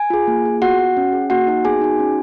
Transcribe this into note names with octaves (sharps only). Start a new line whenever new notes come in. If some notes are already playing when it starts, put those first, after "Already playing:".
Already playing: G#5
F4 G#4
A#3
F4 G#4
B3 F#4 F#5
F#4
C#4
G#4
A#3 F#4 F#5
D#4 F#4
B3 G#4 G#5
D#4 F#4
C#4